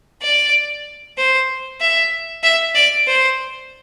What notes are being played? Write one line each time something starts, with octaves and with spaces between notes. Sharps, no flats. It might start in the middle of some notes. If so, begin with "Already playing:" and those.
D5
C5
E5
E5
D5
C5